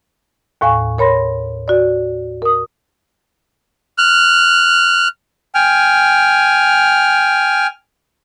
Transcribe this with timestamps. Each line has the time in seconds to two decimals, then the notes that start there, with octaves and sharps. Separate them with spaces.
0.61 D#2 A2 F5 G#5 C#6
0.98 A#4 C#5 B5 C6 A#6
1.68 F#4 D5
2.42 A#4 D#6
3.98 F6 F#6
5.55 G5 G#5 F6